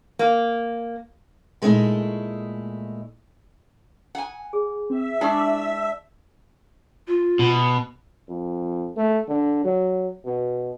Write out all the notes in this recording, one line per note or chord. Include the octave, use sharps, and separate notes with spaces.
A#3
A#2 G#3 A3 B3 D#4 E4
F#5 G#5
G#4
C4 E5
G#3 D4 E4 D5 G#5 C#6
F4
B2
F2
A3
D3
F#3
B2